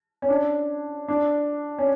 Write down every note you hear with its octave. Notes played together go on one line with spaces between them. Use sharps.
C#4
D4
D4
C#4